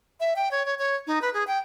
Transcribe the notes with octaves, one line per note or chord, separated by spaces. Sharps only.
E5
G5
C#5
C#5
C#5
D#4
B4
G#4
G5